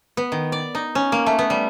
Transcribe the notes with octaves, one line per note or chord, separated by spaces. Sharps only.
B3
D#3
D5
D#4
C#4
A#3
A3
B3
G3